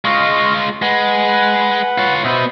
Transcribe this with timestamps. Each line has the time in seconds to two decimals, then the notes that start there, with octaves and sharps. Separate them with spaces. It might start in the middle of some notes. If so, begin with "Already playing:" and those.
0.05 G#3 F4 D#5 F5 C#6
0.82 G#3 B4 F#5 B5
1.98 F4 C#5
2.24 B2 B3 C5 E5 D#6